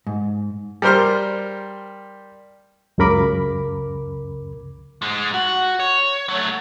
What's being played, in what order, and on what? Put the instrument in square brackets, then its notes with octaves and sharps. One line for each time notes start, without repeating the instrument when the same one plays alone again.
[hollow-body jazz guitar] G#2
[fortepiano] G3 A#4 C5 C6 F6
[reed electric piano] C#2 F#2 C#3 A#4 B5 D6
[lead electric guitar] G#2 G#3
F#4
C#5
F#3 A3